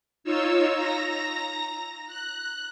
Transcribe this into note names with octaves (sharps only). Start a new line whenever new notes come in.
D#4 F4 C#5 E6
A#5 A#6
F#6